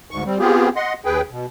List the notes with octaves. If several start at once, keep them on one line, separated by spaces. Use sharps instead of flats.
D2 G#2 C#6
G3 C4
B3 C4 F4 G4 G#4
D#5 F#5 C6
D#2 G#4 B4 G5
B2